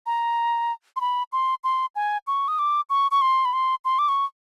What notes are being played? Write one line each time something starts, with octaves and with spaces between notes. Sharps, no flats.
A#5
C6
B5
C6
C6
G#5
C#6
D#6
D6
C#6
C#6
C6
B5
C6
C6
D6
C#6